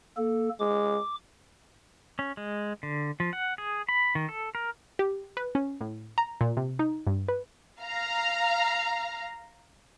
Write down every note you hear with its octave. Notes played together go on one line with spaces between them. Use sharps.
A#3 A4
G#3 D6
C#4
G#3
D3
F3
F#5
G#4
B5
D#3
A4
A#4
G4
B4
C#4
A2
A#5
A#2
C3
D#4
G2
B4
F5 A#5